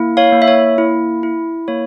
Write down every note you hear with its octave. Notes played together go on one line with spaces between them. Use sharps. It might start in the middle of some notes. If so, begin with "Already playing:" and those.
Already playing: A#3 E4
C#5 F5
A#3
E5
C#5
E4
E4
A#3 C#5